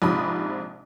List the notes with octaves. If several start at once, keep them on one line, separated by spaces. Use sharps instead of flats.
A#1 G#2 C3 F3 B5 D#6